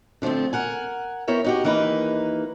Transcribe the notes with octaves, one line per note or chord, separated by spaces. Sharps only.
D3 F3 G#3 A3 C4
A#4 F#5 G#5
B3 E4 A#4 C#5 E5 G5
D#4 F#4 G4
D#2 E3 A#3 D#4 A#4 B4